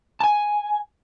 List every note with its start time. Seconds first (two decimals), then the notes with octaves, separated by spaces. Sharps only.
0.20 G#5 A5